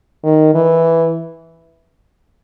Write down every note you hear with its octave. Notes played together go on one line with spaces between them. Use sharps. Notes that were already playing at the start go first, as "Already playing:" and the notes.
D#3
E3